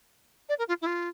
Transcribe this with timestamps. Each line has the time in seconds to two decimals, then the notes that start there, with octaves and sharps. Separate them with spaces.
0.49 D5
0.59 A#4
0.68 F4
0.82 E4
0.86 F4